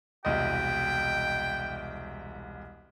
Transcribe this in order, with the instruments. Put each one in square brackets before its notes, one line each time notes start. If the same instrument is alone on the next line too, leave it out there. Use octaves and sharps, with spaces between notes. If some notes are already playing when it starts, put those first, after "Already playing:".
[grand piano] E1 C2 D#5 [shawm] G5